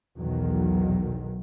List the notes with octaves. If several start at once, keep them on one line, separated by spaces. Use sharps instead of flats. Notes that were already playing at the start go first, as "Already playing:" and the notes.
B1 E2 B2 D#3 F#3